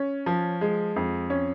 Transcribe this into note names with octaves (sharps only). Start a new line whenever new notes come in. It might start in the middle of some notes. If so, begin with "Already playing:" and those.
Already playing: C#4
F3
G#3
F2
C#4